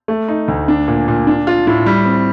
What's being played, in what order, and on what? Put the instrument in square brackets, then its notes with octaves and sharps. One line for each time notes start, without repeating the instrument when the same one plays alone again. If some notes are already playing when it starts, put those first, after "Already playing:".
[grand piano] A3
D#4
D2
D4
A#2
A#2
D4
F4
A2
G3
C4